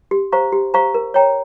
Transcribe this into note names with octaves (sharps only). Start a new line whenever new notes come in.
G4
C5 F5 A#5 C#6
G4
C5 F5 A#5 C#6
A#4
C#5 G5 A#5